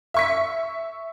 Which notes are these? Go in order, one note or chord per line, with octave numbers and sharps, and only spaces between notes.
E5 C#6 B6